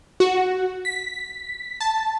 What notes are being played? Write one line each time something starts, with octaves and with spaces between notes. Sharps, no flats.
F#4
B6
A5